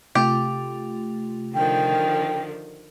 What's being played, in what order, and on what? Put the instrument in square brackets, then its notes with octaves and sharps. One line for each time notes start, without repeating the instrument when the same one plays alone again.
[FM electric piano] C3 A3 F4 [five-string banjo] G4
[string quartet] D3 D#3 F3 [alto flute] G5